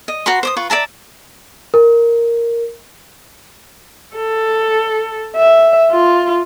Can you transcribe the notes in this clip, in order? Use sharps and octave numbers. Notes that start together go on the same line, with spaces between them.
D#5
F#4 B4 A#5 C6
C5 D6 D#6
F4 B4 C#6
D5 E5 A5 A#5
A#4
A4
E5
F4